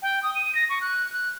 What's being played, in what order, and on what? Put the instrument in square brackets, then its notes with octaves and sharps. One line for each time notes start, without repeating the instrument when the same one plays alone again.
[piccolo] G5
D#6
D#7
A#6
C#6
F#6
F#6